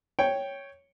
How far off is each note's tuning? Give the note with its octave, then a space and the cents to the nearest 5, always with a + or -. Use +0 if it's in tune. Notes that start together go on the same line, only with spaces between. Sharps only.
C#5 +0 G5 +0